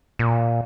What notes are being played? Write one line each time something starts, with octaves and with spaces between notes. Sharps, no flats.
A#2